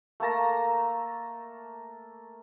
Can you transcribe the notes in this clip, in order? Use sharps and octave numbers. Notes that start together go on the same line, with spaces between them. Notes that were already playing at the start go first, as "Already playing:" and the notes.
A3 A#3 A5 A#5